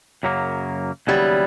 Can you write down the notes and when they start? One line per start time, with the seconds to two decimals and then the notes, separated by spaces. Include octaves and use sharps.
0.23 F#2 C#3 F#3 A#3
1.07 D#2 C#3 F#3 G3 B3 E4